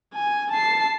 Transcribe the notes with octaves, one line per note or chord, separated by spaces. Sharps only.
G#5
A5 C7